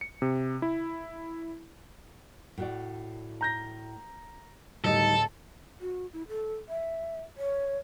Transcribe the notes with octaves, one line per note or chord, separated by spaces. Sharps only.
C#7
C3
E4
A2 F#4 D5
A#5 G6 A#6
D1 D#3 G3 D#4 A4 D#5
F#4
E4
A4
E5
C#5